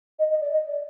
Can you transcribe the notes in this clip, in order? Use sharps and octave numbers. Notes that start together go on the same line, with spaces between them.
D#5
D#5
D5
D#5
D5